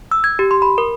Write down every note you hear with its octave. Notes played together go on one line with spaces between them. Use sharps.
E6
G#6
G4
C6
B5
A#4